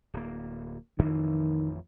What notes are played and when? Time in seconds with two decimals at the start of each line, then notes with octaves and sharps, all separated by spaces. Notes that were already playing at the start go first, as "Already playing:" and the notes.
0.14 D1 A#3
0.99 A1 F2 D#3 E3